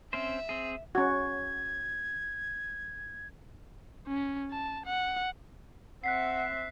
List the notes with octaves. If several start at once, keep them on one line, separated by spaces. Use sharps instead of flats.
C4 C#4 C5 E5
C4 G#4
C#4 F#4 G#6
C#4
A5
F#5
C4 E5 F#5 F#6 B6 C7